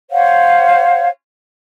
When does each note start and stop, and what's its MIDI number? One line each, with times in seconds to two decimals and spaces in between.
0.11 1.07 72
0.11 1.07 73
0.11 1.07 77
0.11 1.07 78